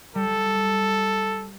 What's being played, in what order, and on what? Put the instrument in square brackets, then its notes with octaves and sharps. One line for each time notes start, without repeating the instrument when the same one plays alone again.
[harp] G3 [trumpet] A4